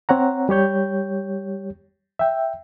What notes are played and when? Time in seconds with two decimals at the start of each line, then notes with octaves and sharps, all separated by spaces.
0.09 C4 C#5 F#5 A#5
0.49 G3 G4 C#5 G6
2.19 E5 G5